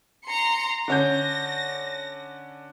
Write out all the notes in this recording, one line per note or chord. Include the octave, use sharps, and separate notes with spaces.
A#5 C6 C#7
D3 C#4 G6 A#6